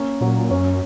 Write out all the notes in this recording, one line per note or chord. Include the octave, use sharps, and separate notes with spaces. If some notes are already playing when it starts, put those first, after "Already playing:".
Already playing: A#3 C#4
A#2 F#3
F#2 C#4